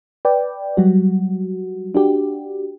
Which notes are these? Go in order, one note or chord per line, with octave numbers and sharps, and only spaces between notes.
B4 D5 G5
F#3 G3 F#4
D4 F#4 G4